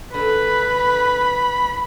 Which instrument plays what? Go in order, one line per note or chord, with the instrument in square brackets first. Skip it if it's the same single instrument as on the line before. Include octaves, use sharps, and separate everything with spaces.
[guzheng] D3 A3 [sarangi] B4 [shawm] B5